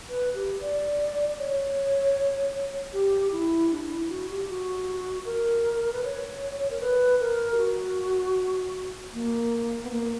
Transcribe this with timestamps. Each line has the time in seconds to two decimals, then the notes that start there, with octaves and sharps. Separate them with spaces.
0.09 B4
0.35 G4
0.61 D5
1.39 C#5
2.93 G4
3.32 E4
3.71 D4
3.90 E4
4.09 F#4
4.30 G4
4.49 F#4
5.25 A#4
5.93 B4
6.04 C#5
6.70 A#4
6.81 B4
7.20 A#4
7.54 G4
7.58 F#4
9.14 A#3
9.84 B3
9.91 A#3